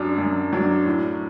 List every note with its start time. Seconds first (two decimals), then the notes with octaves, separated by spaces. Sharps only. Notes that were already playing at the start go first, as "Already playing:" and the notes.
Already playing: F#2 F#3 D4
0.18 F#2
0.53 F#3 D4
0.86 A2